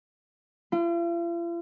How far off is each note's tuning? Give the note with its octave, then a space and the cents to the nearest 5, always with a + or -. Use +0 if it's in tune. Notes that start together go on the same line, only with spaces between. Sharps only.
F4 -45